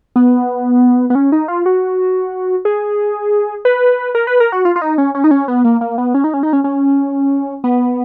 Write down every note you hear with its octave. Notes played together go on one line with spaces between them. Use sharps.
B3
B3
C#4
D#4
F4
F#4
G#4
B4
A#4
B4
A#4
F#4
F4
F4
D#4
C#4
C#4
D#4
C#4
B3
A#3
A#3
B3
C#4
D#4
C#4
D#4
C#4
C#4
B3